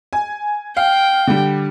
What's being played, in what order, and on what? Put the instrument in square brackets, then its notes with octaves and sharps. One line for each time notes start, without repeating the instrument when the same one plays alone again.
[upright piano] G#5
[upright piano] F5 [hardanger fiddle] G5
[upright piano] D3 G3